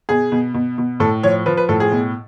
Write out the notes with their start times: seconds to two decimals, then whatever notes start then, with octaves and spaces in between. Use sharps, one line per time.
0.09 B2 G#4
0.32 B2
0.54 B2
0.78 B2
1.00 A2 A4
1.23 F3 C#5
1.46 F3 B4
1.57 B4
1.69 A2 A4
1.80 G#4
1.92 B2